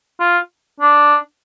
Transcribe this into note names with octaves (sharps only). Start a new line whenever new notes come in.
F4
D4